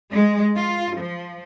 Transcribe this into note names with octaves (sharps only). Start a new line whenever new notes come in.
G#3
F4
F3